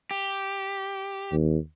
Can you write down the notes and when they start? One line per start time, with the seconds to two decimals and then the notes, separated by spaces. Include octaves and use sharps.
0.11 G4
1.32 D#2